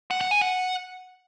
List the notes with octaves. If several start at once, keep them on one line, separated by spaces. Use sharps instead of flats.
F#5
F#5
G#5
F#5